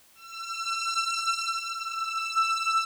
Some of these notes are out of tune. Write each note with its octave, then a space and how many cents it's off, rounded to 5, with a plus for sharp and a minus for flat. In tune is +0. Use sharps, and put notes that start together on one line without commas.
E6 +35
E6 +15